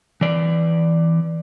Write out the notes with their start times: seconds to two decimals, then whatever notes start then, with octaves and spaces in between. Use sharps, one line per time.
0.21 E3 D5